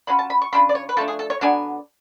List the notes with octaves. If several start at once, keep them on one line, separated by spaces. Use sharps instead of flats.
F#3 C#4 F4 B5
A5
B5
C#6
C#3 G#3 D4 F4 B5
D5
C#5
B4
F3 A3 D4 A4
G#4
A4
C#5
D3 F#3 B3 D4 G#5